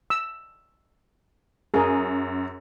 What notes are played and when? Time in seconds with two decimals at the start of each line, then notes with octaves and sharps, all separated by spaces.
0.10 E6
1.74 F#2 G#4 A#4